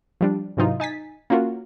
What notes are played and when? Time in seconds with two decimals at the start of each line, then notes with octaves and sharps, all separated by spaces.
0.21 F3 G3 D4
0.57 G#2 C3 E3 F#3 D#4 F4
0.80 D#4 G#5 A6 B6
1.30 A#3 C#4 F4 F#4 A#4